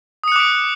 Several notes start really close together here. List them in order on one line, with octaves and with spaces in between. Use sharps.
D#6 C#7 F#6 D6 D7